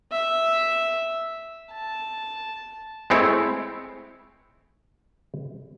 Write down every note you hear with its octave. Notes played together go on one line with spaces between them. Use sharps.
E5
A5
G#3 A3 C4 E4 C#5